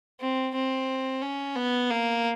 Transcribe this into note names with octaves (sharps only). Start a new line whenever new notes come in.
C4
C4
C#4
B3
A#3